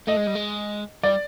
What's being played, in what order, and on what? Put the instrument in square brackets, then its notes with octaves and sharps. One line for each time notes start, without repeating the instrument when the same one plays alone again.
[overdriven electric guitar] A3 [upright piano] D#5
[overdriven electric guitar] G#3
G3
G#3
[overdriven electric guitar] G3 [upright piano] D5